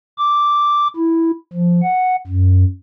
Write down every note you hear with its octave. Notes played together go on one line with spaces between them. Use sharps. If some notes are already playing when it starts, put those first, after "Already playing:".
D6
E4
F3
F#5
F#2